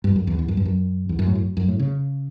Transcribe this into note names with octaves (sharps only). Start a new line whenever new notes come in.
G2
F#2
E2
E2
F#2
G2
F#2
E2
F#2
A2
F#2
F#2
A2
C#3